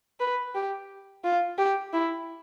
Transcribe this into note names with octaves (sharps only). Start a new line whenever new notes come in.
B4
G4
F4
G4
E4